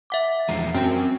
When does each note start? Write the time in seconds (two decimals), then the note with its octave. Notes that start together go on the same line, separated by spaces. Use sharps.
0.10 E5 F#5 D6
0.49 E2 F3 G#3 A#5 C7
0.74 F#2 C4 G5